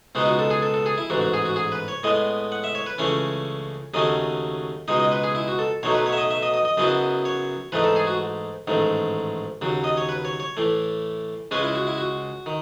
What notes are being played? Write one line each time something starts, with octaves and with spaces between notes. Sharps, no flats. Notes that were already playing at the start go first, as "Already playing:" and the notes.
C#2 B2 G#3 B3 D#4 F#4
F#4
A4
G#4
A4
A4
G#4
E4
A1 G#2 E3 F#4
F#4
G#4
F#4
G#4
B4
C#5
A2 G#3 B3 D#5
F#5
E5
C#5
B4
C#2 C#3 E3 A3 C#4 C#5
D#2 C#3 F#3 A3 C#4 D#5
C#2 B2 G#3 D#4 D#5
D#5
B4
G#4
E4
F#4
A4
B1 B2 F#3 A3 D#4 C#5
B4
C#5
E5
D#5
E5
D#5
D#5
D#5
F#2 C#3 F#3 B3 E4 D#5
C#5
G#2 E3 A3 D#4 B4
A4
G#4
F#4
A1 G#2 D#3 A3
D#2 C#3 F#3
D#5
C#5
B4
C#5
C#5
A2 E3 A3
C#2 C#3 G#3 C#4 B4
E4
F#4
E4
F#4
D#3